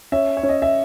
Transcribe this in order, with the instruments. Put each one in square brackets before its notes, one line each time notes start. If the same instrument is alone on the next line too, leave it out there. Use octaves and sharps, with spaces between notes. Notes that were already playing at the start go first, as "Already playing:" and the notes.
[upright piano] C#4 [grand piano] E5
[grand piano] C#5
[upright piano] C#4
[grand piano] D#5
E5